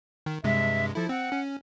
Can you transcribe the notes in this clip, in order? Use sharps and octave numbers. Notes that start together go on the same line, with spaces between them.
D#3
G2 C3 G#3 E5
F3 E4 A4
C4 F#5
C#4